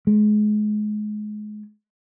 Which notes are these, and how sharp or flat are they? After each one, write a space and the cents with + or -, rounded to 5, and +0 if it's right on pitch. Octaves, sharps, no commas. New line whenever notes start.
G#3 +30